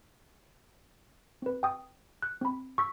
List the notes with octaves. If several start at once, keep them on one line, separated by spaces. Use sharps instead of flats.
C4 B4
G5 D#6
F#6
C4 B5
C#6 E6 B6